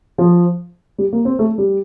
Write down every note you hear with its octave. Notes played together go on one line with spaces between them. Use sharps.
F3
G3
A#3
C4
A3
G3